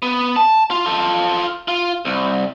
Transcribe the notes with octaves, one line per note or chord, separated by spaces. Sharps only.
B3
A5
F4
F4 A4
F4
C2